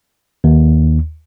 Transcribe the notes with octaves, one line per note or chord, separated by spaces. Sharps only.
D#2